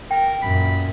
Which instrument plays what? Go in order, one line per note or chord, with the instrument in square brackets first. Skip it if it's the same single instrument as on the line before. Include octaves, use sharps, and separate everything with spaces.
[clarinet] A#4 [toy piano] G5
[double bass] F#2 A#2 [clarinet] B5